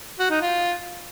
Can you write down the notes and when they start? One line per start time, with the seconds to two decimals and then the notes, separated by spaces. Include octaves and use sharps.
0.19 F#4
0.30 D#4
0.41 F4